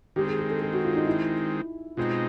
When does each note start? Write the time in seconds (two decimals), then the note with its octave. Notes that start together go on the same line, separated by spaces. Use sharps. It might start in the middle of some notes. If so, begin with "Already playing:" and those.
0.16 D#3 G#3 C4 G4
0.27 G#4
0.39 G#4
0.50 A4
0.62 A4
0.73 F#4
0.84 F4
0.95 D#4
1.07 E4
1.97 B2 G#3 C4 D#4 F4